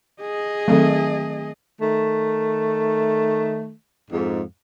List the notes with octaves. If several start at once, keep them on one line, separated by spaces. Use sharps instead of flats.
G#4 D#5
D#3 F#3 A3 C4 A4
D#3 A3
F2 G#2